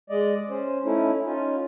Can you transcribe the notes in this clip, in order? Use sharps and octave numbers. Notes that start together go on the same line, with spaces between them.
G#3 D5 D#5
C#4 C5
A3 C#4 D#4 E4
C#4 D#4 F4